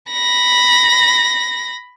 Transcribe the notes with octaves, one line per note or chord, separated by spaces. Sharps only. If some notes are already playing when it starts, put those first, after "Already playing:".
B5 A#6